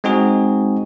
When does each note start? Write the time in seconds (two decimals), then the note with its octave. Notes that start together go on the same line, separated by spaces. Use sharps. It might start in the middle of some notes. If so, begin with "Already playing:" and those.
0.04 G#3 C4 D#4 F#4 G#4